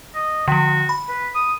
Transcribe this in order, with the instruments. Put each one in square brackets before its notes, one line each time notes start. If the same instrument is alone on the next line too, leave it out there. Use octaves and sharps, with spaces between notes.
[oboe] D#5
[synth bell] D3 F3 [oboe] F#4
[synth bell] B5
[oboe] B4
D#6